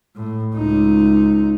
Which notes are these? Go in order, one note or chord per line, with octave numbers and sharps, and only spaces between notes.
A2
C#2 D#4